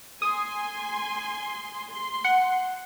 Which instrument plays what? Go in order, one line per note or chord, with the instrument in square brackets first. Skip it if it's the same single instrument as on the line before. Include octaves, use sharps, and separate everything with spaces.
[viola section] G#5 C6 [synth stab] D#6
[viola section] C6
[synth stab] F#5